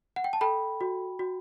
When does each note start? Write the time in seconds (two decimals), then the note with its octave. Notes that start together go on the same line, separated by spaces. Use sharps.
0.16 F#5
0.24 G5
0.33 A5
0.41 A4 G5 B5
0.81 F#4
1.19 F#4